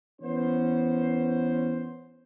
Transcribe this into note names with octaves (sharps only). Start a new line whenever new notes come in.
E3 B3 C#4 C5